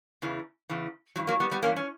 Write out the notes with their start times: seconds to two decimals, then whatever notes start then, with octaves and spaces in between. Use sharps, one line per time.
0.22 E2 C#3 E3
0.69 E2 C#3 E3
1.16 G2 E3 F#3
1.27 F#3 A#3
1.40 G3 B3
1.51 G3 B3
1.62 G2 E3 A#3 C#4
1.76 C#4